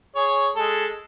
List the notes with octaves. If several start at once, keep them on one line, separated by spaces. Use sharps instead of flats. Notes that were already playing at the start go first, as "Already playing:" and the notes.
G#4 C#5
G#3 A4